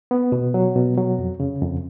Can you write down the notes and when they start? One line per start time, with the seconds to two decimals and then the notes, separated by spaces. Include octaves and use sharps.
0.11 B3
0.32 B2
0.54 F#3
0.76 B2
0.97 F#3
1.19 F2
1.40 C#3
1.62 F2